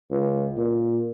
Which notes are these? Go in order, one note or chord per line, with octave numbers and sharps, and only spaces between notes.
C#2
A#2